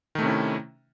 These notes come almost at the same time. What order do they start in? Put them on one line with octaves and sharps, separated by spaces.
D#3 A3 C3 C#4 E4